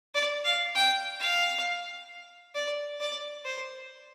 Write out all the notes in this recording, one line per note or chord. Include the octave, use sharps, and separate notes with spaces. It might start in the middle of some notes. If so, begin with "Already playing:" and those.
D5
F5
G5
F5
D5
D5
C5